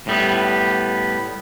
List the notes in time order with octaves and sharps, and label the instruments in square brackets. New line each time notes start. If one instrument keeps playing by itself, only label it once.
[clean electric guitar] A2 G3 B3